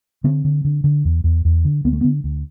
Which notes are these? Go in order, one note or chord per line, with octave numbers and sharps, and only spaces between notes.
D3 C4
D3
D3
D3
E2
E2
E2
D3
D2 B3
A3
B3
D3
D2